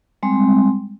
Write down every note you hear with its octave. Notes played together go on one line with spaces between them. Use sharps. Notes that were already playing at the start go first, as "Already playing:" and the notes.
G3 G#3 C4